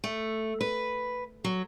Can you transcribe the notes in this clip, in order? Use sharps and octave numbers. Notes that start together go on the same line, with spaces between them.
A3
B4
F#3